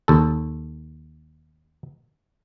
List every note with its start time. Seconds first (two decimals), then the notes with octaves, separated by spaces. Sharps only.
0.08 D#2 A4